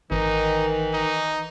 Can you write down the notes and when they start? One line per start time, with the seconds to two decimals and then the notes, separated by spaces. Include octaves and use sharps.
0.11 G#1 D#3 E3 D#4
0.93 D#4